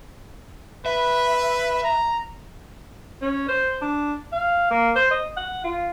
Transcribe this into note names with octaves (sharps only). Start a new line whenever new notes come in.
B4 E5
A#5
C#4
C5
D4
F5
A#3
C5
D#5
F#5
F4